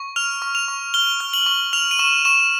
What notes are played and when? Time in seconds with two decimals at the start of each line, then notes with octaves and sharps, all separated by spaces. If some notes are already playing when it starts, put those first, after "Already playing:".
Already playing: C#6
0.16 F6 F7
0.42 C#6
0.55 F7
0.68 C#6
0.94 F6 G7
1.20 F6
1.33 F#7
1.46 C#6
1.73 F6 F7
1.91 D#7
1.99 C#6 E7
2.25 C#6 E7